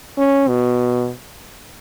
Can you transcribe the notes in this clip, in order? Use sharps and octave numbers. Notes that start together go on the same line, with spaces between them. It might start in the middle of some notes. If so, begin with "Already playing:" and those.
C#4
B2